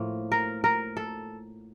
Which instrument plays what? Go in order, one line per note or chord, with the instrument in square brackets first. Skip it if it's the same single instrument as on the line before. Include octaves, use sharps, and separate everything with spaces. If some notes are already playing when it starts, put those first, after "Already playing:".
Already playing: [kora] A2 F3 A#3
A#4
A#4
A4